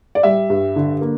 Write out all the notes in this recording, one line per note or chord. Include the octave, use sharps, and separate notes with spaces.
D5
G3 E5
G2
D3
A#3